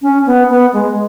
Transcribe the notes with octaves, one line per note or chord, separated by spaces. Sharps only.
C#4
B3
B3
G#3